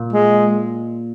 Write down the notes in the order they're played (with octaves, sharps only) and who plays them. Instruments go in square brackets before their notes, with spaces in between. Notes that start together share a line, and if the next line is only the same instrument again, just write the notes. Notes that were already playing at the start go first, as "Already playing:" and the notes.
Already playing: [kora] A#2
[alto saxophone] G#3